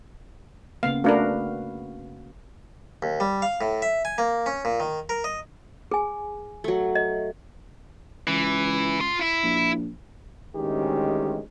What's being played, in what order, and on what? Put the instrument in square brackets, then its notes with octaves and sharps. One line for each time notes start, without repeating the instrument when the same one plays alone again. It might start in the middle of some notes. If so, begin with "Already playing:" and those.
[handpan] C#3 A#3 B3 [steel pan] F5
[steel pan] A3 D4 A#4 [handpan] F#4 B4 F5
[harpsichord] D#2
G3
F5
A2
E5
G#5
A#3
C#4
A#2
D#3
A#4
D#5
[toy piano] G#4 G#5
[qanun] F#3 A3
[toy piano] D#5
[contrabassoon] C#2 [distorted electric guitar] E3
[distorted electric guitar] F4 C6
E4
[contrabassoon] A#1
[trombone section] A1 D2 D#3 G#3 C#4 G4